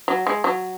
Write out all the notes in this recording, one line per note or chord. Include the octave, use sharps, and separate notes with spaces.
F#3
G#3
F#3